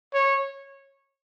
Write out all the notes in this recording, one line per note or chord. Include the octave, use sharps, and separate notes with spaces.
C#5